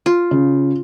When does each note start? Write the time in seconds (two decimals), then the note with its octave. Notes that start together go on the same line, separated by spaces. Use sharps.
0.06 F4
0.31 C#3